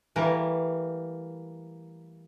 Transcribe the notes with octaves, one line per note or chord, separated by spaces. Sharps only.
E3 G3 A3 A#3 A#4